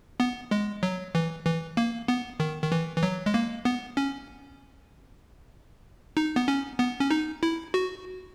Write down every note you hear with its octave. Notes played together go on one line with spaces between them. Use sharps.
B3
G#3
F#3
E3
E3
A#3
B3
D#3
D#3
E3
E3
F#3
G#3
A#3
B3
C#4
D#4
B3
C#4
B3
C#4
D#4
E4
F#4